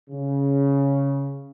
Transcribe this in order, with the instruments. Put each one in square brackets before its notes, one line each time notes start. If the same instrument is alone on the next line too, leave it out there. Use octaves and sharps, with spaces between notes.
[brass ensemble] C#3